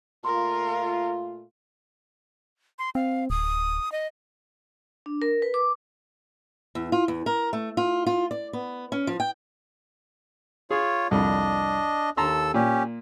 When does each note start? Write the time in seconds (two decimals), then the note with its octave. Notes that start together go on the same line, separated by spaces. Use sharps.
0.25 A#2 A3 F4 A#4 C6
2.79 C6
2.95 C4 F5
3.30 D1 D#6
3.92 D#5
5.06 D4
5.22 A#4
5.42 B4
5.54 D6
6.75 E2
6.92 F4
7.08 E2
7.26 A#4
7.53 A3
7.77 F4
8.07 F4
8.31 D5
8.53 B3
8.92 C#4
9.07 F3
9.20 G5
10.71 F4 G#4 C#5
11.11 C2 F2 D4 D#5
12.17 D#2 A4 A5 A#5 C6 E6
12.54 A#2 C#4 G4